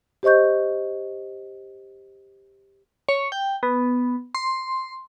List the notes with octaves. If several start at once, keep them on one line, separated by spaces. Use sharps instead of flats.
G4 C5 D#5 C#6 G6
C#5
G5
B3
C6